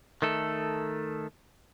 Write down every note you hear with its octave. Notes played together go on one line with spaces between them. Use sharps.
D#3 A3 A4